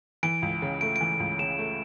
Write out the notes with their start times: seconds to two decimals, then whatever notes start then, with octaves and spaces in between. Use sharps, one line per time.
0.23 E3 D7
0.42 C#2
0.62 C#3
0.81 A3 D7
0.96 E3 D7
1.20 C#2
1.39 C#3 E7
1.59 A3